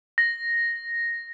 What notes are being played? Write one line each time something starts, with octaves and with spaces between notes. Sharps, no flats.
A#6